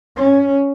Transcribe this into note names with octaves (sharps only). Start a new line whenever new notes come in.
C#4